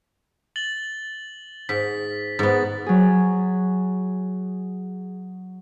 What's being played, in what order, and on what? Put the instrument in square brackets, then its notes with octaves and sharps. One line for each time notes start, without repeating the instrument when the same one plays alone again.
[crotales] A6 F#7 G7
[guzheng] G#2 [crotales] B6
[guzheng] G#2 B3 [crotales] A6
[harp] F#3 G#4